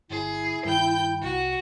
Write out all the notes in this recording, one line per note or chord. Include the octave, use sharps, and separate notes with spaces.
G1 E4 G#4
G2 D#3 G5 G6
C2 F#4